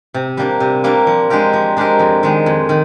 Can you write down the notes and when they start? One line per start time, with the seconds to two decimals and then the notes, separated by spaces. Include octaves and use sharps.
0.14 C3
0.37 G3 A#3 D4
0.60 C3
0.84 G3 A#3 D4
1.07 F3
1.30 G#3 D4 G4 A#4
1.53 F3
1.77 G#3 D4 G4 A#4
1.99 F2
2.23 D#3 G#3
2.46 F2
2.69 D#3